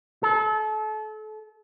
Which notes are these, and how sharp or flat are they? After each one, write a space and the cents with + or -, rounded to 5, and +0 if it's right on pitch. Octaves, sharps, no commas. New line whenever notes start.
A4 -35